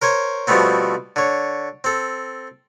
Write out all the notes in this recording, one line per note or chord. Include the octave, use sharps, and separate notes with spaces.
A#4 C5 C#5 G#5
B2 F3 G3 A3 B3 C4
D3 C#5
C4 A4